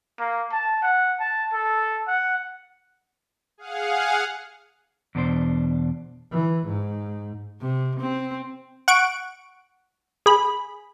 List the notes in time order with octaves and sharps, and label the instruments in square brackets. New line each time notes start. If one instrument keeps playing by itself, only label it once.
[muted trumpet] A#3
A5
F#5
A5
A4
F#5
[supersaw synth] G#4 F5 F#5
[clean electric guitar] E2 B2 D4 C5
[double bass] E3
G#2
[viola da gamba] C3
C4
[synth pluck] F#5 C#6 D7
G#4 B5